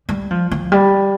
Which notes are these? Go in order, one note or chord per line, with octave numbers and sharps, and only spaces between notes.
G3
F3
F3
G3